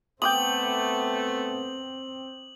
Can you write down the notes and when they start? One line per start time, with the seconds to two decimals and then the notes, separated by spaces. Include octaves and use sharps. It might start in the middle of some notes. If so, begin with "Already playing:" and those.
0.22 A3 B3 C4 G5 D6 D#6 F#7